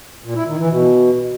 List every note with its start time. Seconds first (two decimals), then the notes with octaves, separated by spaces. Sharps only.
0.24 A#2
0.36 E4
0.47 D#3
0.59 E3
0.71 B2